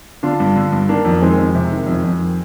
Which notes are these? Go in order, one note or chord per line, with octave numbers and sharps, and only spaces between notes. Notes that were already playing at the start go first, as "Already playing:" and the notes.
D3 D4 F4
G2
D3
G2
D#3 A#3 D4
F2
D#3 G#3 C4
F2
C3
D#3
F2
F2
D#3